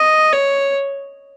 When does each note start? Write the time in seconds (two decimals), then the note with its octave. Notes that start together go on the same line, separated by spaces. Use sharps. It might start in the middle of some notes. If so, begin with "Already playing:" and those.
Already playing: D#5
0.33 C#5